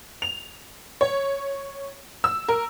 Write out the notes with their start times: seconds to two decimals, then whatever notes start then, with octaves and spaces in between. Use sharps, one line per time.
0.22 F7
1.01 C#5
2.24 E6
2.48 A#4